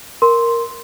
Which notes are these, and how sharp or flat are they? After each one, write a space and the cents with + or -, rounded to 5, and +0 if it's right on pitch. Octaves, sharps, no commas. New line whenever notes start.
A#4 +0 C6 +0